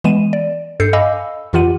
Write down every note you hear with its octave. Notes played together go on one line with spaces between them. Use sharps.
E3 G#3 B3 D#7 E7
D5
G2 A4 G6 C7 C#7
D#5 F5 G#5 B5 D6 E6
F2 E3 F4 G4 F#5 D#7